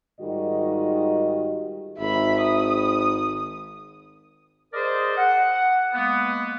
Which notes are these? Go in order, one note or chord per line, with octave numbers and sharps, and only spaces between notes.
G#2 D#3 G3 F4 F#4 D#5
G#1 E5 B5
D#6
G#4 A#4 C5 D5 D#5
F#5
G#3 A#3 B3